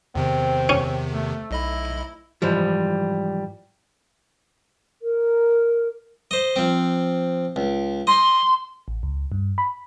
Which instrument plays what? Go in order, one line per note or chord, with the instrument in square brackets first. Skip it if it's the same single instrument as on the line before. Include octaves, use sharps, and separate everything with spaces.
[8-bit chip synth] E2 C3 D#3 [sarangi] C4
[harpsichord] C#4
[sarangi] A3
[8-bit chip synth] B1 D#5 B5 [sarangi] E4
[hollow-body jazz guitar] G#2 E3 F3 G3
[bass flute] A#4
[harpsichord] C5 D#5
F3 C4
C#2
[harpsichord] D#5 [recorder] C6
[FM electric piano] A1
C#2
G2
B5